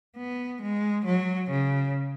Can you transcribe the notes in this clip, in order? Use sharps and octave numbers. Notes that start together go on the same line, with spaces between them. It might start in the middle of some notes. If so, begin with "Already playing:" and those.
B3
G#3
F#3
C#3